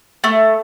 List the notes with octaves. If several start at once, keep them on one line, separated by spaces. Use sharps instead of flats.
A3